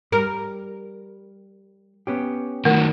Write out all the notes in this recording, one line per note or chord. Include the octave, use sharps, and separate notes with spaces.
G3 A#4
B3 C#4 G4
D#3 F#3 A3 A#4